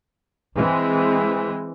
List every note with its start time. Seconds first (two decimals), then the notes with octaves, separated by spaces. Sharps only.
0.54 E3 G#3 C4